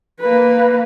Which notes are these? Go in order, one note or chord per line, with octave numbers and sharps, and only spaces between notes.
A#3 B4